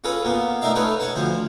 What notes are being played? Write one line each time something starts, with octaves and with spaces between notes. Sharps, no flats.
C#4 F4 G#4 A4 B4
A#2 A#3 B3
A3 D#4 A#4 D5 E5 F5
C#4 D#4 A4 B4 C#5
C#5 F#5 G#5 A5
D2 F3 C5